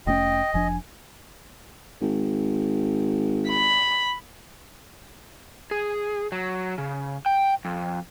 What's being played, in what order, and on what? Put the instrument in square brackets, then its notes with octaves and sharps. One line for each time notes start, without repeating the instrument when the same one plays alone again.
[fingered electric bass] F1 A3 C#4 [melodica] D#5 [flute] G5
[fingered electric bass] F1 F3 D4 [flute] G#5
[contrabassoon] G#1
[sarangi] B5
[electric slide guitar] G#4
F#3
C#3
G5
F2